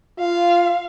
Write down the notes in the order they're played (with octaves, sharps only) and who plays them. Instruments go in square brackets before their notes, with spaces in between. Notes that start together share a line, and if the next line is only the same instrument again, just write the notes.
[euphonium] F4 [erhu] F5